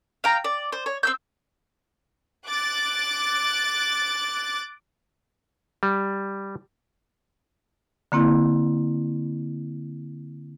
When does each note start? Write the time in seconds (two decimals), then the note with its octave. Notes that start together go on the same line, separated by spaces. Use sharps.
0.24 F5 G5 A#5
0.44 D5
0.72 C5
0.86 C#5
1.03 C4 E6 G6
2.48 D6 F#6 A6
5.83 G3
8.12 D3 A#3 C4 E4